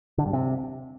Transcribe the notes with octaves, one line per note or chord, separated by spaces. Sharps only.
D3
G2
C3